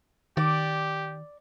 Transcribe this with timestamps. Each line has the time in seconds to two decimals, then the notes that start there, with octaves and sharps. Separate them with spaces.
0.37 D#3 G4 D5